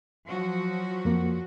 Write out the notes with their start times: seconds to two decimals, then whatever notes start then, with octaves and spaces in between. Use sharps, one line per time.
0.27 F3 F#3 F#4
1.05 F2 A#3